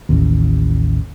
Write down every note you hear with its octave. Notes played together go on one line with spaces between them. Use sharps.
A1 D#2